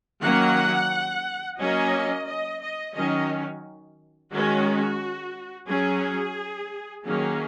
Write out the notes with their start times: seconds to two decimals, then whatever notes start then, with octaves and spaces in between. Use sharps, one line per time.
0.22 D#3 F#3 A#3 C#4 F#5
1.59 F#3 A#3 C#4 D#5
2.26 D#5
2.61 D#5
2.94 D#3 F#3 C#4 D#5
4.31 D#3 G#3 C#4 F#4
5.67 F#3 C#4 G#4
7.03 D#3 F#3 A#3 C#4 G#4